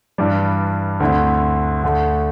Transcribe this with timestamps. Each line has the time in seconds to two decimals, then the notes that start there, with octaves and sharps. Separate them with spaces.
0.18 G2 E3 G3 D4
1.00 D2 D3 A3 C4 E4
1.83 D2 D3 A3